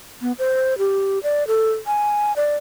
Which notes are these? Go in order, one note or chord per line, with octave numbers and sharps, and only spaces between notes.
B3
C5
G4
D5
A4
G#5
D5